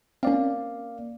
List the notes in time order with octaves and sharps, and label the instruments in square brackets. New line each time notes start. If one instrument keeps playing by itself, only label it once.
[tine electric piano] A#3 D5 F5 [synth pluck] C4 C#4